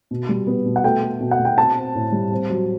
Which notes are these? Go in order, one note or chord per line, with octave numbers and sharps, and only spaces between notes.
B2
G3
B3
B2
F#5
A3 G5
A3
B2
F#5
B2
G5
C4 A5
C4
A2
G3
C4
F#3